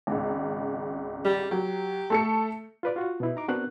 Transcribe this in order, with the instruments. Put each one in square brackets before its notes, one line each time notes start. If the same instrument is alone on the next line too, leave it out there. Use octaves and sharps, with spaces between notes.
[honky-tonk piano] G#1 C#2
[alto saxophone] G3
[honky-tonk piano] F#3 [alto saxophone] G4
[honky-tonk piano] A3 A4 C#7
[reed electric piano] F4 B4 D5
F4 F#4
B2 B3 E4
D#4 A#5 D6
B3 C4 D4 F#4 A#4 F#6